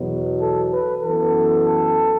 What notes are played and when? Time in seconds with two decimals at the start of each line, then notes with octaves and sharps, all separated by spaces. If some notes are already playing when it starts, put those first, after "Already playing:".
Already playing: E2 B2 F#3
0.40 A4
0.72 B4
1.03 F#2 E3 B3 A4